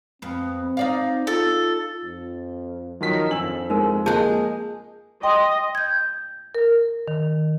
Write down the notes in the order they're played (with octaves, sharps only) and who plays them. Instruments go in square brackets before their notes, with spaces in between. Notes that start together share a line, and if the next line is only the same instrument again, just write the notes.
[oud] F2 B3 [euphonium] C4
[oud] D#4 D5 F5
[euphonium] F4 [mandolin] A4
[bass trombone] F2
[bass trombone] D#3 [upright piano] F3 F#3 B6
[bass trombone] F2 [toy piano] D4 [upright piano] E6 F#7
[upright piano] G#3 [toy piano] D#4 A#4
[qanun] G#3 G#4 [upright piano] A#3 G6 [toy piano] A5
[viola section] D#5 [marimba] G5 C6
[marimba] G6 G#6
A#4
D#3